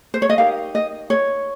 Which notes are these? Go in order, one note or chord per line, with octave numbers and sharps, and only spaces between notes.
C5
C#5
D#5
D#4 G4 A#4 F5
D#5
C#5